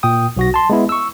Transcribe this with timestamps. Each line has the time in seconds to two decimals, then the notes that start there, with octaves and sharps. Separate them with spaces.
0.03 A#2 G5 D#6
0.37 B1 F#4 A#6
0.54 A5 C6
0.70 G#3 B3 E4
0.89 C#6 E6